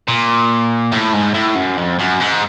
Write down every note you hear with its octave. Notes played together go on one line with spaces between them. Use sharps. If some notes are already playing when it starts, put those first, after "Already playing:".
A#2
A2
G#2
A2
F#2
F2
F#2
G#2